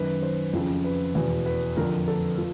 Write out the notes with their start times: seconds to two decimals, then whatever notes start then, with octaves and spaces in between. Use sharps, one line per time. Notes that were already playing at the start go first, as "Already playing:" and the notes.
Already playing: F#2 D#3 B4
0.22 C5
0.53 F2 C#3 F3
0.84 B4
1.15 E2 B2
1.46 B4
1.77 F2 D3 F3 A#4
2.08 A4
2.38 F3